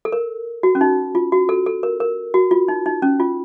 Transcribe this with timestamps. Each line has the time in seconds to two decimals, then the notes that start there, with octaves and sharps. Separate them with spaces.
0.05 A4
0.12 A#4
0.63 F#4
0.75 C#4
0.81 D#4
1.15 F4
1.32 F#4
1.49 A4
1.66 A4
1.83 A#4
2.00 A#4
2.34 F#4
2.51 F4
2.68 D#4
2.86 D#4
3.02 C#4
3.20 F4